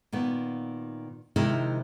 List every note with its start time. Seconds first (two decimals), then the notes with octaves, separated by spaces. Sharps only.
0.12 A#2 D#3 B3
1.36 C3 D#3 F3 G#3 E4 A#4